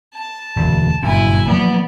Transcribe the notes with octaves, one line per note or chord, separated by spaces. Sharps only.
A5
E1 D2
F#1 G2 A#2 E4 G#5
F3 F#3 A#3 B3 D5